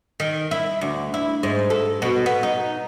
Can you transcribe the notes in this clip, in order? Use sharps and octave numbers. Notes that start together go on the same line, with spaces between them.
D#3
E4
D2
E4
G#2
A4
B2
B3
D#4